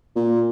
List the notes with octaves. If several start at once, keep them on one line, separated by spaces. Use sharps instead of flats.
A#2